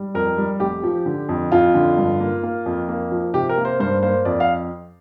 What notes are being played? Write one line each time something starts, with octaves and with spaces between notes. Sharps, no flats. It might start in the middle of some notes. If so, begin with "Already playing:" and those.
Already playing: G3
F2 A#4
G3
F1 G4
F3
D3
F2
F2 F4
D3
G2
A#3
A#3
F2
A#3
F3
C3 G4
A#4
A#3
C5
G2 C5
A#3 C5
F2 D5
F5